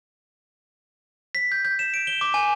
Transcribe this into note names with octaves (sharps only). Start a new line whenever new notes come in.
B6
G6
G6
E7
D7
G7
D6
G#5